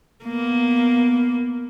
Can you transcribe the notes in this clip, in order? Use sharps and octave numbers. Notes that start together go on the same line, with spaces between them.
A#3 B3